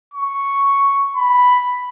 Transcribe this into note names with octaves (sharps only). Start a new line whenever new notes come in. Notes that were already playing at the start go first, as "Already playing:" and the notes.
C#6
B5